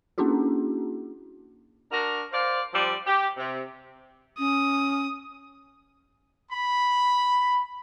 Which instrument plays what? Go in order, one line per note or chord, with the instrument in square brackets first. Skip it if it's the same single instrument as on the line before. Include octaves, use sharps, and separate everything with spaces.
[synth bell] A#3 C#4 D4 E4 F#4 G#4
[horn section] D4 F#4 A#4
C5 D5 F5
F3 G3 C4 D5
G4
C3
[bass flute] C#4 [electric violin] D#6
[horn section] B5